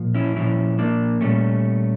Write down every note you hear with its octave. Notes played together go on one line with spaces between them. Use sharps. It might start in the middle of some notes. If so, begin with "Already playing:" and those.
Already playing: A#2 F3
C#4 E4
A#2 F3 C#4 E4
A#3 D4
A#2 G3 A3 C#4